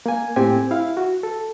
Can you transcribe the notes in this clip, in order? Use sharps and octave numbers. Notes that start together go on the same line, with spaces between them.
A#3 G#5
A2 C4 G4 G#5
E4 F5
F#4
A4